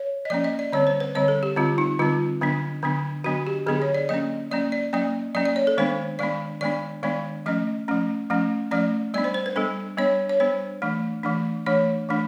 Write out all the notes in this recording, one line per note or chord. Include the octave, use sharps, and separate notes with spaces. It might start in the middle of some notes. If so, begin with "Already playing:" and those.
Already playing: C#5
D#5
F3 A#3 C#4 D5
D#5
D5
D3 G3 C4 C#5
C5
B4
D3 G3 C4 C#5
A4
G4
D3 G3 C4 F4
D#4
D3 G3 C4 F4
D3 F#3 B3 D4
D3 F#3 B3 D4
D3 F#3 B3 D4 F#4
G4
D3 F#3 B3 D4 G#4
C#5
D5
F#3 A#3 C#4 D#5
F#3 A#3 C#4 D5
D5
F#3 A#3 C#4 D5
F#3 A#3 C#4 D5
D5
C#5
A4
D#3 G#3 B3 D4 C5
D#3 G#3 B3 D4 D5
D#3 G#3 B3 D4 D5
D#3 G#3 B3 D4 D5
F3 A3 C#4 D#5
F3 A3 C#4
F3 A3 C#4
F3 A3 C#4 D5
G3 B3 D4 D5
C5
C5
B4
G3 B3 D4 A4
G3 B3 D4 C#5
C#5
G3 B3 D4 C5
E3 A3 D4
E3 A3 D4
E3 A3 D4 C#5
E3 A3 D4